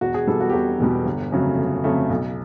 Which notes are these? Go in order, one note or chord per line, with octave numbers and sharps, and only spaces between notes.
E1 F#4
G#4
E2 B2 G3 A4
F#4
G4
E1 F#4
E2 B2 G3
G1
F2 C#3 F#3 A3
G1
F2 C#3 F#3 A3
B1